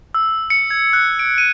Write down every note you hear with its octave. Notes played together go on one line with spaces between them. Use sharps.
E6
C#7
G#6
F#6
D7
D#7